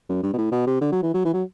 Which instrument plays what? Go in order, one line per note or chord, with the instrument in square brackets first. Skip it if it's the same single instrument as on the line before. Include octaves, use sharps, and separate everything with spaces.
[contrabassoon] F#2
G2
B2
A2
B2
C3
D3
F#3
E3
F#3
E3
F#3